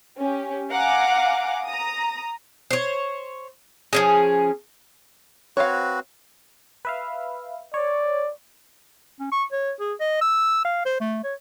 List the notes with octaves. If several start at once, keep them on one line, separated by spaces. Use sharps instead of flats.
C#4 G4
F5 F#5 G#5 A#5 D6
A#5 D#6
C5 C#5
F3 C#4 G#4
C4 F#4 B4 C#5 F5
B4 E5 F5
C#5 D5
C#4
C#6
C#5
G#4
D#5
E6
F5
C5
A3
C#5